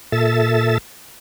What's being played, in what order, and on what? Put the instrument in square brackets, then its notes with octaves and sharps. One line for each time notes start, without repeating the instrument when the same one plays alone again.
[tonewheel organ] A#2 A4 E5 A6